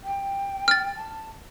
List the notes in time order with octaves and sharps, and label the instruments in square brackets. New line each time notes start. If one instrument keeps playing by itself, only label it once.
[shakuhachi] G5
[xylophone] F6 A6
[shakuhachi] A5